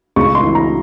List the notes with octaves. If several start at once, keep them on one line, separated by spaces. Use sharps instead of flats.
C#2 C#6
C6
E3
A#5